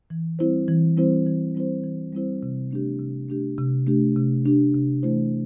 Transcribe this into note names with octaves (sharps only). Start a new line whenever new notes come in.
E3
G3 C4 E4 C5
E3
G3 C4 E4 C5
E3
G3 C4 E4 C5
E3
G3 C4 E4 C5
C3
A3 D4 G4
C3
A3 D4 G4
C3
A3 D4 G4
C3
A3 D4 G4
C3
E3 A3 E4 C5